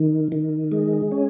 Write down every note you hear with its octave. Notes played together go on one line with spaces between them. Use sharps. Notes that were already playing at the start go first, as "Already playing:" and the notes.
Already playing: D#3
D#3
G#3
C#4